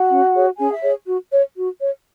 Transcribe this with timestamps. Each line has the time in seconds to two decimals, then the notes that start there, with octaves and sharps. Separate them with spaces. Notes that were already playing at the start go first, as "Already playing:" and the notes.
Already playing: F#4 F#5
0.09 C#4
0.34 G#4 C#5
0.58 C#4 G#4 G#5
0.74 E5
0.82 G#4 C#5
1.06 F#4
1.31 C#5
1.56 F#4
1.80 C#5